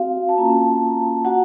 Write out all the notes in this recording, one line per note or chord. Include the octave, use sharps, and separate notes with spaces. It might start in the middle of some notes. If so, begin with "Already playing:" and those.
Already playing: C4 F#4 F5
A5
A#3 C#4 F4 A#5
F#4 F#5